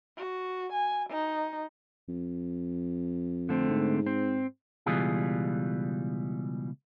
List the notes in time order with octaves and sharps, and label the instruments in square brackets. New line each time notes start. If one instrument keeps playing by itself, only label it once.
[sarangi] F#4
G#5
D#4
[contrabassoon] F2
[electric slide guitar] D3 A3 C4
[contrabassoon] G#2
[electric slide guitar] C4
[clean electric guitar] C#2 B2 E3 G3 F4 G#4